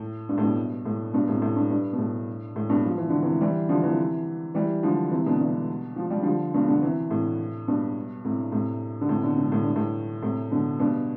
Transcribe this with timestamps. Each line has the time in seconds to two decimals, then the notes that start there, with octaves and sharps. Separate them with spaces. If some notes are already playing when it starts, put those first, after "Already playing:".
Already playing: A2
0.29 G2
0.38 A2
0.43 G2 B2
0.86 A2
1.13 G2 B2
1.28 A2 C3
1.42 A2
1.56 G2
1.70 G2
1.93 B2
1.98 A2
2.56 A2
2.69 G2 B2
2.85 F3
2.98 E3
3.09 D3
3.23 C3 E3
3.41 E3 G3
3.69 D3 F3
3.83 C3 E3
4.55 E3 G3
4.83 D3 F3
5.11 C3 E3
5.26 B2 D3
5.39 G2 B2
5.96 F3
6.10 G3
6.23 D3 F3
6.54 G2 B2
6.68 B2 D3
6.82 C3 E3
7.11 A2 C3
7.68 G2 B2
8.25 A2 C3
8.52 A2 C3
9.01 D3
9.09 A2 C3
9.23 B2 D3
9.38 B2 D3
9.52 A2
9.64 G2
9.76 A2
10.23 A2 C3
10.51 B2 D3
10.79 G2 B2